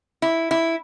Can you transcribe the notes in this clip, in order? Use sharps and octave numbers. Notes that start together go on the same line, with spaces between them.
E4
E4